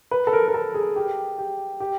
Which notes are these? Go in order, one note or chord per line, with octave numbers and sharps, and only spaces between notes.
B4
A4
A#4
A#4
A4
G#4
G4
G4
G4